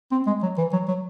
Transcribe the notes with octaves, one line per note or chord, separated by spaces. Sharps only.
C4
G#3
F#3
E3
F#3
F#3